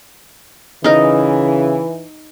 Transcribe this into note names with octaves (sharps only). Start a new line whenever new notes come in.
C#3 E3 D#4 A#4